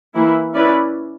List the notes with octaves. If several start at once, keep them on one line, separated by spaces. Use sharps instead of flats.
E3 A#3 E4
C#4 E4 B4 D5